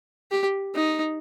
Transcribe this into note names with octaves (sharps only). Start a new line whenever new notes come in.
G4
D#4